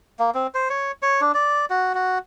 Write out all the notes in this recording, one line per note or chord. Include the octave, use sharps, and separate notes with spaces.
A#3
C4
C5
C#5
C#5
D4
D5
F#4
F#4